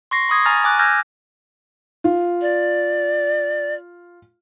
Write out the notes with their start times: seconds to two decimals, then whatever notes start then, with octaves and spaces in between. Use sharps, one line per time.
0.11 C6 C#6 A#6 C7
0.29 B5 C#6 D#6 G#6
0.45 G#5 A#5 C#6 F6 A6 A#6
0.64 G#5 D6 F#6
0.79 E6 F6 G6 G#6 A#6
2.04 F4
2.41 D5